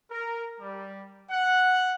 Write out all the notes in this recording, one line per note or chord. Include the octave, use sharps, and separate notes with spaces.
A#4
G3
F#5